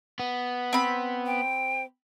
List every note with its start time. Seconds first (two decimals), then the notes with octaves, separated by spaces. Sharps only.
0.20 B3
0.73 C4 B5
1.26 G5